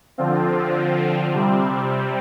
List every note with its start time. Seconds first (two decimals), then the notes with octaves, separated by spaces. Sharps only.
0.18 D3 F3 C4 F4
1.34 C3 G3 C4